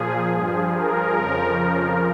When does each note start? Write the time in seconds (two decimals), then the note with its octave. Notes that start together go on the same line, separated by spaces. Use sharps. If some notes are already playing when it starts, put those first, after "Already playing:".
Already playing: A#2 F3 G#4
0.32 G2 F3
0.74 A#4
1.16 F2 C#3 F3